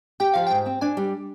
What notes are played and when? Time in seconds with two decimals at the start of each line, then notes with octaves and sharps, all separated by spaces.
0.20 G4 G5
0.34 F3 F5
0.47 G#2 G5
0.66 C4
0.81 D4 G#5
0.97 G3